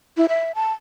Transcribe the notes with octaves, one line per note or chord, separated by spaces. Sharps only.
E4
E5
A5